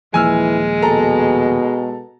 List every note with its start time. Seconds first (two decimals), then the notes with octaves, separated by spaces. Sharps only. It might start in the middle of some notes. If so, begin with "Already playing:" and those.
0.14 D#1 E3 F3 G#3 A#3 G#5 E6 F6
0.82 B2 A4 A#5